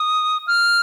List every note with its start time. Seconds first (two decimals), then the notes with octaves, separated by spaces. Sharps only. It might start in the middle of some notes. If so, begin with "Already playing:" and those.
Already playing: D#6
0.47 F6